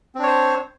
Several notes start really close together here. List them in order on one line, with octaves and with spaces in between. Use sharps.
C4 D4 C#5 C5